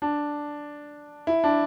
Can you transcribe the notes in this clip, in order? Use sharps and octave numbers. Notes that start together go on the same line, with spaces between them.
D4
E4
D4